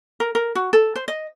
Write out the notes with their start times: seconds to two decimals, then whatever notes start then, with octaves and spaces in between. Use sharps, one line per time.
0.20 A#4
0.35 A#4
0.55 F#4
0.73 A4
0.96 C5
1.08 D#5